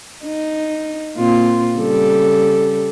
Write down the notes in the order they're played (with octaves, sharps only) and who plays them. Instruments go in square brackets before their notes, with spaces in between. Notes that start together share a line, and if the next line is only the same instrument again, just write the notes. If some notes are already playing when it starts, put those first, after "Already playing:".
[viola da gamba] D#4
A#2 C4 F4
C#3 G3 A4